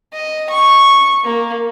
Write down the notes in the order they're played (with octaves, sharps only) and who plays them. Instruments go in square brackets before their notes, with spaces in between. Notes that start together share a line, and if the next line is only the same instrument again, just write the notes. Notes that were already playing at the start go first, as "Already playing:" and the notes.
[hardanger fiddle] D#5
C#6
A#3